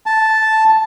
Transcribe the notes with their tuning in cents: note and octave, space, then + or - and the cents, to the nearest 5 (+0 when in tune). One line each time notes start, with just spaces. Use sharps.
A5 -5